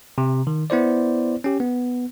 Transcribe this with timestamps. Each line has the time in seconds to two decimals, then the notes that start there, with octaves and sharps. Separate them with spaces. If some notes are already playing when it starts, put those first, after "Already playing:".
0.18 C3
0.47 D#3
0.70 B3 E4 C5 D5
1.44 C#4 G4
1.60 B3